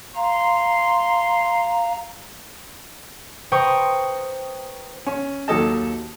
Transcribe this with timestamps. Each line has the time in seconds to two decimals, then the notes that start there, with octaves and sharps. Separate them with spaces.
0.16 F5 A#5 C6
3.52 B4 C5 G5 A#5 C#6 D#6
5.06 C#4
5.48 D#2 F#3 D#4 A4 D#5 A5